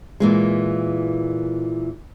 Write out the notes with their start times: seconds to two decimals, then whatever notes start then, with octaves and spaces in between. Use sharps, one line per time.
0.20 A#2 E3 G#3